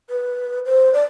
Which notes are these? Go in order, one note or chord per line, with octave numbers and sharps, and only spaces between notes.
B4
C5
D5